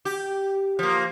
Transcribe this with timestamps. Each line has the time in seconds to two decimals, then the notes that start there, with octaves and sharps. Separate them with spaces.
0.05 G4
0.79 F3 A#3